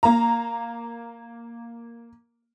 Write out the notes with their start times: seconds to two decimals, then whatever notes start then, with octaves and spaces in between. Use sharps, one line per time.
0.03 A#3 A#5